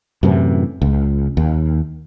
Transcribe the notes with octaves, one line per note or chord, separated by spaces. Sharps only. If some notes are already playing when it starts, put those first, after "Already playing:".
F#2 A2 C3 E3
C#2
D#2